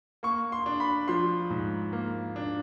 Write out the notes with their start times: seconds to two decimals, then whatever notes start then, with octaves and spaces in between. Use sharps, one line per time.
0.23 A#3 C#6
0.52 C6
0.66 D4
0.80 B5
1.08 F3 C6
1.50 G#2
1.93 A#3
2.36 D4